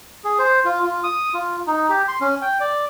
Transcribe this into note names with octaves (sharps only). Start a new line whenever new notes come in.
G#4
C5
F4
F4
D#6
F4
D#4
G4
C6
C#4
G5
D5